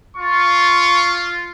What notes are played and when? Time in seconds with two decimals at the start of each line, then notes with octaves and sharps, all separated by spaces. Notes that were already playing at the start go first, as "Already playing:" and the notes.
0.17 F4 C#6